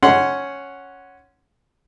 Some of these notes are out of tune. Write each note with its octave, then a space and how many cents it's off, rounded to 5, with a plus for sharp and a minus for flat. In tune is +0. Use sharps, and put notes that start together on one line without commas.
C#4 +0 F#5 +0 C6 -10